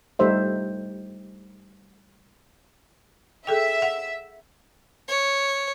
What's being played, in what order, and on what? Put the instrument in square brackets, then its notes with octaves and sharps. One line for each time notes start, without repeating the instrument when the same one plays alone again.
[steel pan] G3 A3 D#4 C5 E5
[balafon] G#4 A4 G5 [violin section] E5
[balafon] F#5
[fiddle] C#5